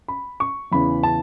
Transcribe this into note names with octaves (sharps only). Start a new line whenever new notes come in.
B5
C#6
E2 C#3 E3 B5
A5